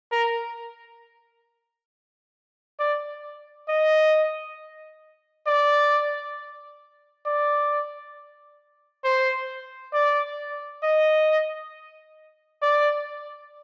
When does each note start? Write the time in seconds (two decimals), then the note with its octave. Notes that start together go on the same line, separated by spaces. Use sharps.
0.12 A#4
2.80 D5
3.69 D#5
5.47 D5
7.26 D5
9.05 C5
9.94 D5
10.83 D#5
12.62 D5